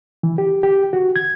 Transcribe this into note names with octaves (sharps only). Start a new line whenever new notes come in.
E3
G4
G4
F#4
G#6